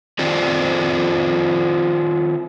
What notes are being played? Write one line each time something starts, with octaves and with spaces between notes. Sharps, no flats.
D#3 C4 F4 C5 D5